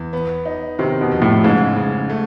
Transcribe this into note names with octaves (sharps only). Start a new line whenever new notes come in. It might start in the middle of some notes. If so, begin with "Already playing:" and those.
Already playing: E2
B3
D#4
C3 D#3
B2
F2
A2
G#2 C#3
C#3
A3